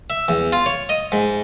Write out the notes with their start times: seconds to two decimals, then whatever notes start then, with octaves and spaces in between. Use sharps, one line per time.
0.10 E5
0.28 E2
0.53 F4
0.66 C#5
0.89 D#5
1.12 G#2